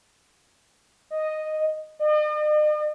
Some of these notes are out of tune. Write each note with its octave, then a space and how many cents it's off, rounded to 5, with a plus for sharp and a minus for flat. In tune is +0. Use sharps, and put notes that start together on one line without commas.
D#5 -5
D#5 -45